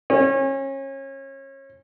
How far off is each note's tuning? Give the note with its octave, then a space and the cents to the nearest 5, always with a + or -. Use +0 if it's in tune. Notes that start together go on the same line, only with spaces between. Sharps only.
C#4 -30